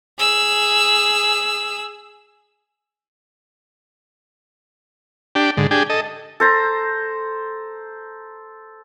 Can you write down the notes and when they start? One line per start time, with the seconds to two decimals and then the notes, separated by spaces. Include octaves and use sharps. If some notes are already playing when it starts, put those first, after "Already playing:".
0.19 G#4 E6
5.35 D4 G4
5.57 G#2 D3
5.71 D4 G4 G#4
5.90 A4 D#5
6.40 A4 C5 A#5